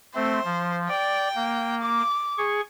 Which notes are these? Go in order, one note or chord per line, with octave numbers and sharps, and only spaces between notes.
A3 C4 C5
F3
D5 G5
A#3
D6
G#4 C#6